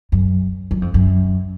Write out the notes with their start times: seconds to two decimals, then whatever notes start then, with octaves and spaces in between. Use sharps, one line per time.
0.12 F#2
0.71 F#2
0.82 F2
0.94 F#2